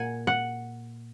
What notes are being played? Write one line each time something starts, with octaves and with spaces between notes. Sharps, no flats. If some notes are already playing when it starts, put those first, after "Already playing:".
Already playing: A#2 F#5 G#5
F#5